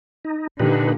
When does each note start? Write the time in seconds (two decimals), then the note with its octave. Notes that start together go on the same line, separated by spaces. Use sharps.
0.25 D#4
0.60 A#2 D3 D#4 G4 B4